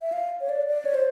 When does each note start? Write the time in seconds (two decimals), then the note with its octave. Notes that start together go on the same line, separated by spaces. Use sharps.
0.02 E5
0.12 F5
0.41 C#5
0.49 D5
0.67 D5
0.85 C#5
0.94 C5